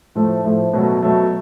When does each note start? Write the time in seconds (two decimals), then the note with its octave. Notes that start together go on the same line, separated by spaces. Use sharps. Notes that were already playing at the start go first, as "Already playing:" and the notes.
0.15 A2 F3 A3
0.44 A2 F3 A3
0.73 B2 F#3 A3
1.02 B2 F#3 A3